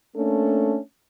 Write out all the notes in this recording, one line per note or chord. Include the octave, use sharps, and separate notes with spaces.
A3 A#3 C#4 D4 A4